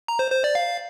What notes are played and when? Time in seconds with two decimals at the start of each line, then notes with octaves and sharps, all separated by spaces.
0.08 A#5
0.19 C5
0.31 C5
0.44 D5
0.55 F5